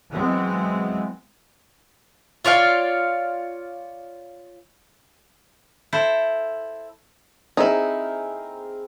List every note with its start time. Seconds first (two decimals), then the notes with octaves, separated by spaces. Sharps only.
0.12 E3 F#3 G#3 B3 C4
2.44 F4 C#5 D5 F5
5.93 E4 A4 C5
7.57 C4 D#4 E4 G#4 A#4